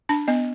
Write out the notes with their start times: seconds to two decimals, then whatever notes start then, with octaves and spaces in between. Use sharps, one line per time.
0.09 D4 A5
0.28 B3 D#5